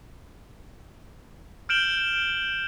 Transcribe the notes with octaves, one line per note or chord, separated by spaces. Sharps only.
F6 G6 D7 E7 F#7 G7